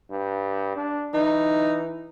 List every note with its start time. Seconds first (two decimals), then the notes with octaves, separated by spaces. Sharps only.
0.10 G2
0.76 D4
1.14 E3 D#4